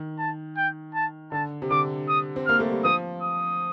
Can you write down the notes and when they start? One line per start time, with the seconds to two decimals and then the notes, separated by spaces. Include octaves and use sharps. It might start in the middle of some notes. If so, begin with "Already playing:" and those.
Already playing: D#3
0.18 A5
0.57 G5
0.94 A5
1.32 D3 A5
1.62 C3
1.70 D3 D6
2.08 D#6
2.36 C4
2.46 A#3 F6
2.60 A3
2.72 G3
2.84 F3 D#6
3.23 D#6